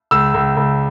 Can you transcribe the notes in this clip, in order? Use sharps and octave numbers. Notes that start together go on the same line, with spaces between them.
C#2 E6
C#2
C#2